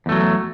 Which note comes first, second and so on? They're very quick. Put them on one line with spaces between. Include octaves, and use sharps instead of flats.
E2 A3 F#3